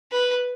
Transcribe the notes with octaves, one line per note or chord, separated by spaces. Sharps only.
B4